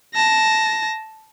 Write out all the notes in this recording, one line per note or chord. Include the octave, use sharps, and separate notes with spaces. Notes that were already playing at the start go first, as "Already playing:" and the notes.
A5 A#6